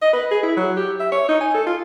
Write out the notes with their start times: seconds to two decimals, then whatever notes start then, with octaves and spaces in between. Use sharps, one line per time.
0.02 D#5
0.13 B4
0.31 G#4
0.43 E4
0.56 F#3
0.77 G4
1.00 E5
1.12 C#5
1.28 D#4
1.41 G#5
1.54 A4
1.66 F4